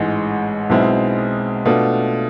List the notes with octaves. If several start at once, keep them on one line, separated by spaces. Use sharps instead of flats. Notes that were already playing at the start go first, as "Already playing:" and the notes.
Already playing: A1 G#2 G#3
B1 B2 G#3 C4 E4
B2 A3 D4 F4